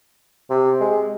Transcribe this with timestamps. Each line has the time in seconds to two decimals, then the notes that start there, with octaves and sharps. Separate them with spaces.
0.50 C3
0.81 G#3